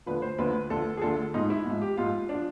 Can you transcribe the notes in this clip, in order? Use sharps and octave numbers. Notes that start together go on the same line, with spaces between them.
D2 D3 F3 B4
C5
D2 D3 F3 B4
D2 D3 F3 A4
G#4
D2 D3 F3 A4
G#2 F3 D#4
E4
G#2 F3
G4
G#2 F3 F4
F3 D4